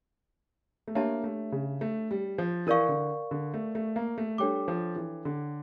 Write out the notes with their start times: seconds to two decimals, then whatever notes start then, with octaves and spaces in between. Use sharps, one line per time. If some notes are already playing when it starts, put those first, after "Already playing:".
0.88 A3
0.95 A#3 D4 G4 C#5 E5 A5
1.24 A3
1.52 C#3
1.81 A3
2.11 G3
2.38 F3
2.67 E3 A#4 D5 F5 C#6
2.89 D3
3.31 D3
3.54 A3
3.75 A3
3.96 A#3
4.18 A3
4.38 G3 D4 A4 C#5 G5 D6
4.68 F3
4.96 E3
5.25 D3